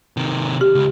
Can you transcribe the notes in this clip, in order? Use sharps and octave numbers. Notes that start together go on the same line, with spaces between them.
C3 D#3
G4
C#2